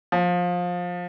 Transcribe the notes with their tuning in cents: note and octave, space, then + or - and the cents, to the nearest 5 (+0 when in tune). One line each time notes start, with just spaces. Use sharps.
F3 +20